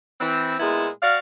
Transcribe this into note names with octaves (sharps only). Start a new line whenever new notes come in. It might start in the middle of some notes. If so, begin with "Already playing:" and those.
E3 C4
A#2 G#3 B3 E4
F#4 D5 F5